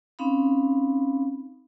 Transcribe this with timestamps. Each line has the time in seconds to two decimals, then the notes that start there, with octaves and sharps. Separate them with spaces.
0.19 C4 C#4 D#4 F5 B5